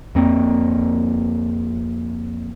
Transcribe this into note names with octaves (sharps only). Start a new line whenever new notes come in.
F2 A#3 C4